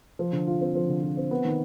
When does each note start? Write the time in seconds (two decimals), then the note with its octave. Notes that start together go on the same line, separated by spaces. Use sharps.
0.19 F3
0.32 D3
0.47 F4
0.61 C4
0.75 F3
0.88 D3
1.02 F4
1.17 C4
1.31 B3
1.45 D#3